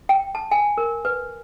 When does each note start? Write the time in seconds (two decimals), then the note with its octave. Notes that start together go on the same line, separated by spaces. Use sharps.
0.09 G5
0.35 A5
0.51 G#5
0.78 A#4
1.05 B4